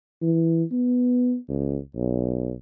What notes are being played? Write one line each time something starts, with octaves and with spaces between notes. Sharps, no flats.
E3
B3
C#2
B1